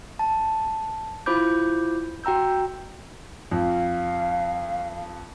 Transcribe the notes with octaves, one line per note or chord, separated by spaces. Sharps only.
A5
E4 F4 C5 B5 D6 G6
F#4 G5 A#5 E6 G6
F2 F5